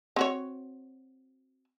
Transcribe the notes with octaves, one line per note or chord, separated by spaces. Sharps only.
C4 F#4 C#5